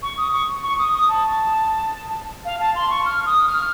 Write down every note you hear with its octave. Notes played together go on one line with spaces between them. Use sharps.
C#6
D#6
C#6
C#6
D#6
D#6
A5
F5
A5
C6
C#6
F6
D#6
F6